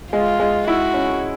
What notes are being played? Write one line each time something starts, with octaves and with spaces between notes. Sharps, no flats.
G#3 F4
G#3
E4 F#4
C#4